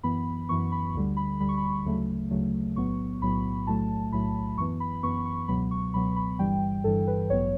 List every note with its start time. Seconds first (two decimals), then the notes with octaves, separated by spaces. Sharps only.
0.03 F#2 E3 B3 B5
0.49 F#2 E3 B3 C#6
0.72 B5
0.94 D2 D3 G3
1.17 B5
1.40 D2 D3 G3 B5
1.49 C#6
1.57 B5
1.85 D2 C#3 F#3 A3
2.31 D2 C#3 F#3 A3
2.76 B1 A2 F#3 B3 C#6
3.21 B1 A2 F#3 B3 B5
3.67 B1 A2 F#3 A3 A5
4.12 B1 A2 F#3 A3 B5
4.58 F#2 E3 B3 C#6
4.80 B5
5.03 F#2 E3 B3 C#6
5.26 C#6
5.48 C#2 B2 F#3 B3 B5
5.71 C#6
5.94 C#2 B2 F#3 B3 B5
6.16 B5
6.39 G1 G2 E3 G3 G5
6.84 G1 G2 E3 G3 A4
7.07 B4
7.30 A1 G2 F#3 B3 C#5